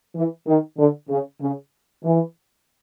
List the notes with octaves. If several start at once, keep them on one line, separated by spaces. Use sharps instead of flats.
E3
D#3
D3
C#3
C#3
E3